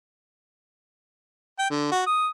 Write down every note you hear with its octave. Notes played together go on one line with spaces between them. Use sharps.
G5
D3
F#4
D#6